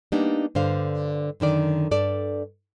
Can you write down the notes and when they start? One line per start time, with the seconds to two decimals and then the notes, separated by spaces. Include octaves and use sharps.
0.12 G3 A#3 B3 D4 D#4
0.55 G2 D3 C5 F5
1.40 F#2 D3 D#3 D5
1.91 G2 A4 D5